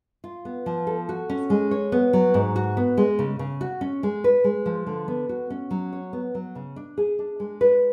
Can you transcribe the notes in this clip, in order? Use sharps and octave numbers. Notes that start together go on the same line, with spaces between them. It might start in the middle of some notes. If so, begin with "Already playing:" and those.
F4
B3
F3
A4
F#4
C#4
G#3
C#5
B3
F#3
G#2
F#4
B3
G#3
C#3
C#3
F#4
C#4
G#3
B4
G#3
F3
D3
B3
F#4
C#4
F#3
C#5
B3
F#3
C#3
D4
G#4
D4
G#3
B4